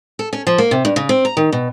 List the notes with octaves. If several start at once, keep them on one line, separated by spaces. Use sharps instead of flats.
A4
C#4
F3
A#3
C3
G2
C#3
C4
A#5
D#3
B2